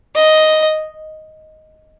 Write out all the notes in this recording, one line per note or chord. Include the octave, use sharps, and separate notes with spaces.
D#5